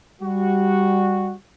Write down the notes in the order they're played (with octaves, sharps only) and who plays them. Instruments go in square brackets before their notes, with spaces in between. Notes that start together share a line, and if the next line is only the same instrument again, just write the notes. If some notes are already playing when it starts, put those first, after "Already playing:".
[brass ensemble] G3 F#4